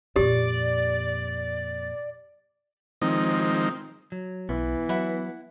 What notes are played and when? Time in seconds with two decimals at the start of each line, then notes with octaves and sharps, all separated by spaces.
0.16 F2 A#2 G4 D5
3.02 D#3 F3 G#3 C4 D#4
4.12 F#3
4.49 B1 E3 B3
4.89 F#3 E4 F#5